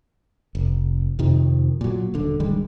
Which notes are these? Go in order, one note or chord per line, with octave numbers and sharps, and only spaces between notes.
F1
F2 C3 D#3 F3
A#2 F#3
D#1 D3
D1 D#3 G3 G#3